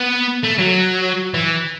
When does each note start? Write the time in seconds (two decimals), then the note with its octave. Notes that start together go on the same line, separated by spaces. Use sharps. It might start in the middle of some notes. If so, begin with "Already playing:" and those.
Already playing: B3
0.44 A3
0.59 F#3
1.34 E3